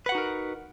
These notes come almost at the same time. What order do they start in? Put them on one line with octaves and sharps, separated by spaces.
B4 F#5 F#4 D#4 A#4